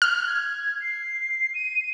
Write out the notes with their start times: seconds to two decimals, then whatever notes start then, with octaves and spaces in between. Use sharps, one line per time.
0.02 F6
0.27 G#6
0.81 C7
1.54 D#7